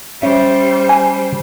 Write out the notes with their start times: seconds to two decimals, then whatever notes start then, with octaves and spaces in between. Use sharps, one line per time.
0.22 G3 C#4 C5 E5
0.89 G#5